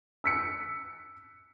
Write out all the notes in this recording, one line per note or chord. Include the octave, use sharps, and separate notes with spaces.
E6 B6 C#7